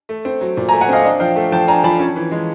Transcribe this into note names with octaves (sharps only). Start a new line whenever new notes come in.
A3
C4
F#3
A#2
G#5 A#5
A3
F#5 G#5
C4 D#5 F5
D4 D#5 F5
F3 F5 G5
A3
F3 G5 A5
D4 G#5 A#5
F3 A5 B5
C#4
E3
G#3